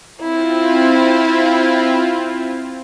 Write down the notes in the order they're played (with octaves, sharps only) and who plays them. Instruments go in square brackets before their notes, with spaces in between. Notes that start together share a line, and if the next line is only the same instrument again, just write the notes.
[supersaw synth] C4 F4 [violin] E4